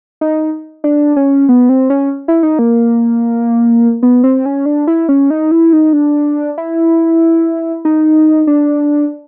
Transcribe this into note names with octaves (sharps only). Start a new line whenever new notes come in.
D#4
D4
C#4
B3
C4
C#4
E4
D#4
A#3
B3
C4
C#4
D4
E4
C#4
D#4
E4
D#4
D4
E4
D#4
D4